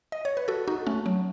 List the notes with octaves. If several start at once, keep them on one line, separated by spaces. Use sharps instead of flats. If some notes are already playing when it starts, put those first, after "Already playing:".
D#5
C#5
B4
F#4 A4
D#4 F#4
A3 C#4
F#3 A3